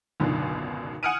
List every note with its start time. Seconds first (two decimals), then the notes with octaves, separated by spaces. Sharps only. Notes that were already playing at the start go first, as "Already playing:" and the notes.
0.20 G#1 C#2 F#2 B2 D3 D#3
1.03 F#5 G#5 D#6 F6 D7 D#7